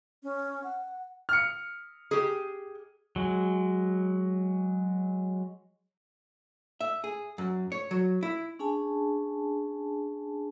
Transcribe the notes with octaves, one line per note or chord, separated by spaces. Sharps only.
C#4
F#5
F6 C#7
G4 G#4
F#3 G#3
E5
G#4
F#2
C#5
F#3
E4
C#4 D4 G#4 G#5 A5